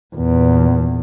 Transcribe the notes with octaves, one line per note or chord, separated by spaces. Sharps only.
E2 A#2